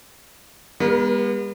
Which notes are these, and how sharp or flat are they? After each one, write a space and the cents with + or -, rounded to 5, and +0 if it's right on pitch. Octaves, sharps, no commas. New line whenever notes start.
G3 +45 B3 -35 A#4 +25